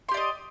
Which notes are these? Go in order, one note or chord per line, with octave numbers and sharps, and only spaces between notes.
G4 D5 D#5 C6